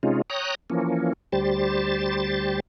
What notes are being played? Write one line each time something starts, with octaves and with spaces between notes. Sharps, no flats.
C3 G#3 C#4 D#4 F4
C#5 G5 A#5 D#6 F#6
E3 F3 A#3 C#4
D2 G3 G4 C5 A6